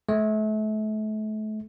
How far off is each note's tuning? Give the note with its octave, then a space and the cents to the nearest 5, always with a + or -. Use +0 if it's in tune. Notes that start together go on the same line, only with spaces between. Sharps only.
A3 -35